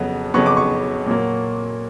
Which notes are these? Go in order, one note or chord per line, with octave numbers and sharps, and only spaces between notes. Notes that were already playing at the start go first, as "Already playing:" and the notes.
Already playing: F2 C#3 F#3 B3
F2 C#3 F#3 B3 C#6
D6
C#6
A#2 F#3 A#3